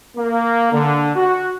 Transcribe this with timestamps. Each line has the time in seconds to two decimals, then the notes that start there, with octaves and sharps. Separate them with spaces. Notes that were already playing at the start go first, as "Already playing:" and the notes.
0.17 A#3
0.73 D3
1.16 F#4